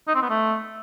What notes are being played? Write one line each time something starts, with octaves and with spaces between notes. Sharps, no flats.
D#4
C4
B3
A3